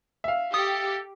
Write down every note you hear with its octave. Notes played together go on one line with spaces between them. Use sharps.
E5 F5
G4 A4 D#6